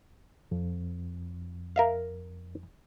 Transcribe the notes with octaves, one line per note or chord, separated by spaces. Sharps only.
F2
A#4 E5 F5